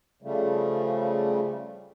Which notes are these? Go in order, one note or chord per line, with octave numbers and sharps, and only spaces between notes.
C#3 F3 G3 A3